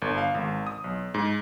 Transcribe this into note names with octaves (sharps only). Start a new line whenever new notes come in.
G1
F5
G#1
D#6
B1
G#2